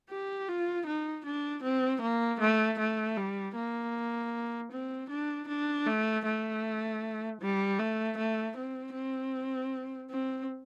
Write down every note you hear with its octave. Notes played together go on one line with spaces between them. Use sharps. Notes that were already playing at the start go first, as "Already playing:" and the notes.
G4
F4
D#4
D4
C4
A#3
A3
A3
G3
A#3
C4
D4
D4
A3
A3
G3
A3
A3
C4
C4
C4